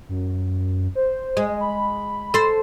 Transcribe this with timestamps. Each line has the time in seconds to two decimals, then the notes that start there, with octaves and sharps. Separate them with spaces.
0.09 F#2
0.95 C5
1.37 G#3
1.60 B5
2.34 A4 C5